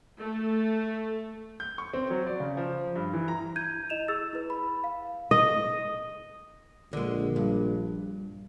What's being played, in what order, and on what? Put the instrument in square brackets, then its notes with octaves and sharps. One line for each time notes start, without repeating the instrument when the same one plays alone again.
[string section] A3
[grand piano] G6
C#6
C4
F#3
D5
C#3
F3
G2
E3
A#5
[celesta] E4 G6 G#6 D#7
E4 D#5 E7 F7
G#4 E6 A6
E4 B4
B5
F5
[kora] D#5
[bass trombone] A#1 [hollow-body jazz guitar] D3 G#3
[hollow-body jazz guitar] G2